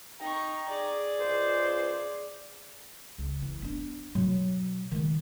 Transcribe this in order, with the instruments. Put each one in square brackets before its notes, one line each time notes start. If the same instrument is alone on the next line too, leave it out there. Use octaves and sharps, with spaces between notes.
[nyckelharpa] D#4 C#6 [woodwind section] G5 A#5
[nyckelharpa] G#4 D5
[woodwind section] C#2 C5
[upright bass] C#2
E3
B3 D4
B2 F#3
D#3 G#3